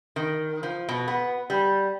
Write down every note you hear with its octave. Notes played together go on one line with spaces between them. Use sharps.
D#3
F3
B2
B3
G3